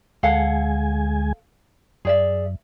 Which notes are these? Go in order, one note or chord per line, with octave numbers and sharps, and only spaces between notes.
D2 G#3 A4 F5 F#5 G#5
F#2 G#4 D5 E5